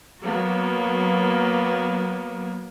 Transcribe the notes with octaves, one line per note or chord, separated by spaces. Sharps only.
F#3 A#3 B3